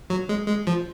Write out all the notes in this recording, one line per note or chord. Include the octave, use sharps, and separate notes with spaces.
F#3
G#3
G#3
F3